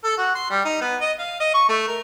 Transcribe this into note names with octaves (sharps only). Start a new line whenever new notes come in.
A4
F#4
C6
G3
D#4
B3
D#5
F5
D#5
C#6
A3
A#4